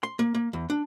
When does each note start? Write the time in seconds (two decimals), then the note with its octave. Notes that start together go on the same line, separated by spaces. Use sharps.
0.03 C6
0.19 A#3
0.35 A#3
0.53 E2
0.70 D4